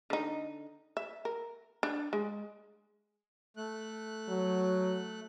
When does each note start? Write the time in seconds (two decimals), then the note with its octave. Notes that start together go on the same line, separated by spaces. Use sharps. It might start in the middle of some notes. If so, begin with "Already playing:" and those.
0.10 D3 D#4
0.97 E5
1.25 A#4
1.83 D4
2.13 G#3
3.57 A3 F#6
4.28 F#3